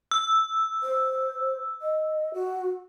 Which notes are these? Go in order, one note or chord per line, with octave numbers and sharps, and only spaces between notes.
E6
C5
D#5
F#4